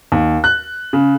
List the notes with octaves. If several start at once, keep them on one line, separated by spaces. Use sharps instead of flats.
D#2
F#6
C#3